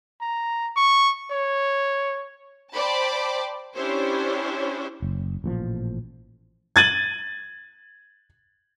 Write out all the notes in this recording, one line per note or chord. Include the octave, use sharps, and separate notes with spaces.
A#5
C#6
C#5
C5 D5 G5 A5 B5
C#4 D4 E4 G4 C5 C#5
F#1
A1 A#2 F3
G#6 A6 D#7 F#7